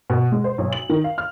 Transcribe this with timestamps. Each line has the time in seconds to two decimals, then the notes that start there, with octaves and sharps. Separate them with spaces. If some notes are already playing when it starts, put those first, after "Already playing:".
0.10 B2
0.32 G#3
0.44 C5
0.58 B1
0.73 F#7
0.90 D#3
1.04 F5
1.18 F6